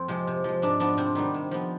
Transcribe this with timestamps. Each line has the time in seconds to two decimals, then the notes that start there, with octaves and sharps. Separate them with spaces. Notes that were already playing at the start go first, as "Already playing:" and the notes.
Already playing: F2 C4 F4
0.08 C3 F3 G#3
0.27 C3
0.44 F3 G#3
0.62 G#2 D4
0.80 F3 B3 D4
0.97 C3 C4
1.15 D#3 G3 B3
1.34 C3
1.51 F3 B3